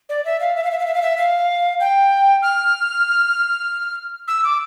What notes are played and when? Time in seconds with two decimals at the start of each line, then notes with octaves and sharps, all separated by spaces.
0.09 D5
0.25 E5
0.40 F5
0.56 E5
0.64 F5
0.71 E5
0.79 F5
0.86 E5
0.94 F5
1.02 E5
1.18 F5
1.80 G5
2.42 F6
4.28 E6
4.44 D6